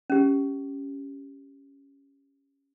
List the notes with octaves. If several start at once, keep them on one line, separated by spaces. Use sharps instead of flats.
C#4 G4